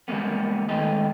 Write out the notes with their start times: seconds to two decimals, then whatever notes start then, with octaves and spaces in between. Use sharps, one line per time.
0.08 E3 G3 G#3 A#3 B3
0.69 D#3 G#3 A3 B4 D#5